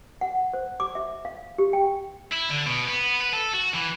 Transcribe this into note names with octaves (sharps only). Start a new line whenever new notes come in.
F#5
C5
D6
E5
F5
G4
G5
E4
D3
B2
B3
B4
A4
F#4
E3